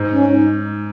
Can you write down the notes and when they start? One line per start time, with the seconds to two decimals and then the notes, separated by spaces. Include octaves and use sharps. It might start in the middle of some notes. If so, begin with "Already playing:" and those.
Already playing: G#2
0.12 C#4
0.31 D#4